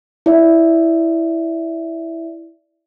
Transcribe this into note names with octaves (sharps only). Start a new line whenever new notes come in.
E4 D5 E5